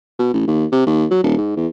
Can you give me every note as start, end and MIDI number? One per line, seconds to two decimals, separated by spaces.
0.19 0.32 47
0.33 0.45 33
0.47 0.65 39
0.72 0.82 48
0.86 1.05 39
1.10 1.22 54
1.23 1.37 27
1.37 1.52 44
1.56 1.67 40